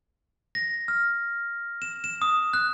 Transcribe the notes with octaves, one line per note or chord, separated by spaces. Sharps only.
A#6
F6
E7
E7
D#6
F#6